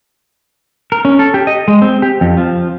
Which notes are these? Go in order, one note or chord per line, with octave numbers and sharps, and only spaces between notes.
A#4
C#4
A4
G4
D#5
G#3
C4
G4
F2
F3